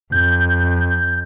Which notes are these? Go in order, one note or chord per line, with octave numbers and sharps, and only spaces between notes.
F2 G6